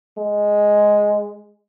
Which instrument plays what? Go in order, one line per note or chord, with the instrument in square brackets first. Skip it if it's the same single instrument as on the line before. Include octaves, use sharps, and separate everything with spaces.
[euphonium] G#3